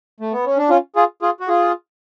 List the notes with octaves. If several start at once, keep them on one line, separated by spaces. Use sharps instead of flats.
A3
B3
C#4
D4
C#4 F4
F4 G#4
F4 G#4
F#4
F4 G#4